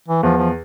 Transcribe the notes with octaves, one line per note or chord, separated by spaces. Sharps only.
E3
E2 F3
F3